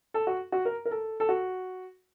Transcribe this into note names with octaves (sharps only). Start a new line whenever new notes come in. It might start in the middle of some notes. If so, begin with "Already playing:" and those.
A4
F#4
F#4
A#4
A#4
A4
A4
F#4